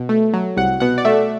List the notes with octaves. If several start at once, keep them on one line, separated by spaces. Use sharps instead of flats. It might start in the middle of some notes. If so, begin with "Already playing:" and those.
Already playing: B2
A3
F#3
C2 F#5
B2 F#5
D5
A3 E5